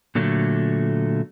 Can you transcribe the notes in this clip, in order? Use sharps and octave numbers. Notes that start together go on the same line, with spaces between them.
A#2 D3 F#3 A3